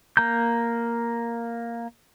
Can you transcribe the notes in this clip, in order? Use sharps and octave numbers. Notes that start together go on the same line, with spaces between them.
A#3 A#5 G6